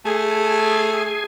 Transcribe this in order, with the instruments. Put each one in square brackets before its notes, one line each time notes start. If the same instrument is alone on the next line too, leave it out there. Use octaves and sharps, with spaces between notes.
[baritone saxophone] A3 [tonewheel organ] G#4 G#5